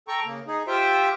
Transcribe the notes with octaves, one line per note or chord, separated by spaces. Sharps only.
A4 G5 A#5 C#6
C#3 A#3
D#4 G#4
F4 G4 C5 E5 G5